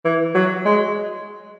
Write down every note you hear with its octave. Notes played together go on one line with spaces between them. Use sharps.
E3
F#3
G#3